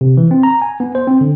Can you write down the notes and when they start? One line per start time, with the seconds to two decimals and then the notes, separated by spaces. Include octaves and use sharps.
0.01 C3
0.17 E3
0.31 C4
0.43 A#5
0.62 G#5
0.80 B3
0.95 C5
1.07 C4
1.21 D3